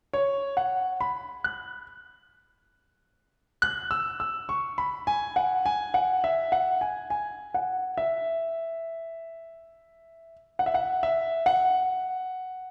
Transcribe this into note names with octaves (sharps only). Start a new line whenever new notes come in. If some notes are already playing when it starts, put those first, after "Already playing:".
C#5
F#5
B5
F#6
F#6
E6
E6
C#6
B5
G#5
F#5
G#5
F#5
E5
F#5
G#5
G#5
F#5
E5
F#5
E5
F#5
E5
F#5